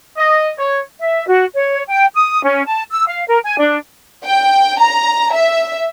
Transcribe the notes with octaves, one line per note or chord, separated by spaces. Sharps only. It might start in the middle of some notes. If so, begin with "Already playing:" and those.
D#5
C#5
E5
F#4
C#5
G5
D#6
C#4
A5
E6
F5
A#4
G#5
D4
G5
A#5
E5